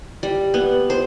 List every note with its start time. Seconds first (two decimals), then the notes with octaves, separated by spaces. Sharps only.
0.23 G3
0.54 B3
0.90 C5